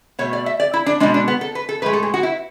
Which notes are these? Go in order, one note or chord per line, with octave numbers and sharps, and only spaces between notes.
B2 A3 C#5
D5
E5
D5
E4
D4
B2 G#3 D4
D4
B3
A4
B4
A4
A2 G#3 B4
A4
G#4
F#4
E4